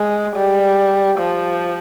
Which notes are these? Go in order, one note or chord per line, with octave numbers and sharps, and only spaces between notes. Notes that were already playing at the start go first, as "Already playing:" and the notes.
Already playing: G#3
G3
F3